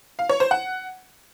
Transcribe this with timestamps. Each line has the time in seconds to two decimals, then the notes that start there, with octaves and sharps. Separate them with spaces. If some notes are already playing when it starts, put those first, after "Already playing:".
0.19 F5
0.29 C#5
0.40 C5
0.51 F#5